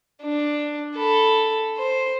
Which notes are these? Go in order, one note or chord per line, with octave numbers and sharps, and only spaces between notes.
D4
A4 B5
C5